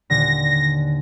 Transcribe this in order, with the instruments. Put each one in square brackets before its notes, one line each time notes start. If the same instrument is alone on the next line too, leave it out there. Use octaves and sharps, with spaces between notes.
[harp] D#2 A#2 D3 [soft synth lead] A#6